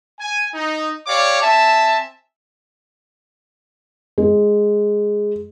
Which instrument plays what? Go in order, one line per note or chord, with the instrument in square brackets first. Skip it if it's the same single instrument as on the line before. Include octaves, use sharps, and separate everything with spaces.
[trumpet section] G#5
D#4
G4 C#5 D5 F5 D6
C4 E5 G#5 A5
[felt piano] G#3